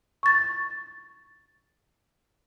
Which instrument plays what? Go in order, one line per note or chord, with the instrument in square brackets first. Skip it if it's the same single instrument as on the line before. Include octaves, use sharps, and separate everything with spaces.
[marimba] C#6 A6